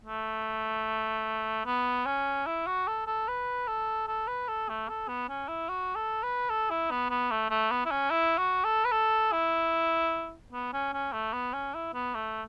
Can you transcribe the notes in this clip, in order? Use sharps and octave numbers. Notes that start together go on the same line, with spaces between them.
A3
B3
C#4
E4
F#4
A4
A4
B4
A4
A4
B4
A4
A3
A4
B3
C#4
E4
F#4
A4
B4
A4
E4
B3
B3
A3
A3
B3
E4
C#4
E4
F#4
A4
B4
A4
E4
B3
C#4
C#4
A3
B3
C#4
E4
B3
A3